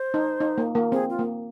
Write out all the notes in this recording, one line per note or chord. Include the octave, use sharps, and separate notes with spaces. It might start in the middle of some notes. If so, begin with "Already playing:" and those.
Already playing: C5
D#4
D#4
A#3
A#3
C4 G#4
F4
A#3